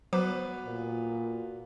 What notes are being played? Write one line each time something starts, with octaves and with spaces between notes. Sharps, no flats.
F#3 B3 F#4 B4 C5 D6
A#2